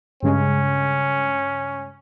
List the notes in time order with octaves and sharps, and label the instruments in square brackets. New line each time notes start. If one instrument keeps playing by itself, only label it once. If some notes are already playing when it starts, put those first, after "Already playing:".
[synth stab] G2 C#3 G#3 [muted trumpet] C#4